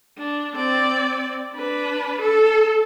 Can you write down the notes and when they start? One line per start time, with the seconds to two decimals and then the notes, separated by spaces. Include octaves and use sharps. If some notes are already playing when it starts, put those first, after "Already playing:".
0.19 D4
0.56 C4 D5
1.54 D4 B4
2.21 A4